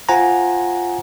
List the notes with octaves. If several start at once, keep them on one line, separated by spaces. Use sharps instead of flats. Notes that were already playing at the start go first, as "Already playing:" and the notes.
F4 C5 F#5 G#5 A#5